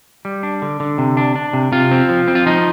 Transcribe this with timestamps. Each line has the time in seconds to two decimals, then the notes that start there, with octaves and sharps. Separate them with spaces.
0.25 G3
0.43 D4
0.62 D3
0.80 D3
0.98 C3
1.17 D4
1.36 D4
1.53 C3
1.72 C3 F4
1.91 C4
2.09 F3
2.28 C4
2.35 F4
2.46 F3 D#4